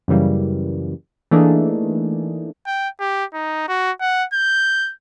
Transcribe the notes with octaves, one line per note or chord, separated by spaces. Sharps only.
F#2 C#3 E3 G3 A#3
E3 A3 A#3 D4 D#4 G#4
G5
G4
D#4
F#4
F#5
G6